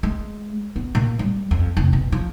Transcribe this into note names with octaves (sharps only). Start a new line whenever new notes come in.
G#3
B3
A#2
G3
F2
F1
B2
F3